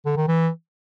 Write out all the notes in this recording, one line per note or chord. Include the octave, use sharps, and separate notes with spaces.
D3
D#3
E3